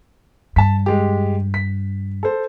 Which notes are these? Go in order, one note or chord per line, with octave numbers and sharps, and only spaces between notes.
G2 A5 B6
G#3 G4
B6
A4 C5